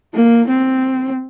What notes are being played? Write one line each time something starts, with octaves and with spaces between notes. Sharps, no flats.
A#3
C4